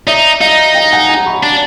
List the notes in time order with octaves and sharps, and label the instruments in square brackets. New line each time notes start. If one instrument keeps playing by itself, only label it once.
[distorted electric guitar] D#4 [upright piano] D5 E5
[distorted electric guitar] D#4 [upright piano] D#5 F5
[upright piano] F5 G5
F#5 G#5
G#5 A#5
B5 C#6
[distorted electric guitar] D4